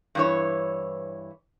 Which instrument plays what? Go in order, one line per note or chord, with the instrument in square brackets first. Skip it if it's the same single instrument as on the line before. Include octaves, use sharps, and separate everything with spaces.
[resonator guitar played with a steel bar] G2 E3 C#5